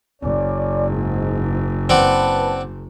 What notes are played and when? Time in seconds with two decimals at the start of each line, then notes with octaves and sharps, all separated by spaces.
0.22 F#1 C#4 D5
0.90 G#2
1.89 C4 B4 D5 F#5 A5